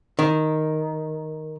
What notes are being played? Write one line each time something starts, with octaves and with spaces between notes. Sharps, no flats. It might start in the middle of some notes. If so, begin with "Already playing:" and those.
D#3